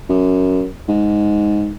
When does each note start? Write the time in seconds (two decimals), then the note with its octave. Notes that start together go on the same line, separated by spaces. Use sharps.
0.09 F#2
0.88 G#2